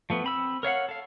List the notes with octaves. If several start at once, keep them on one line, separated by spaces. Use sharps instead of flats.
F3 A3 B3
C4 B5 E6
A#4 C#5 F5 F#5
A4 F5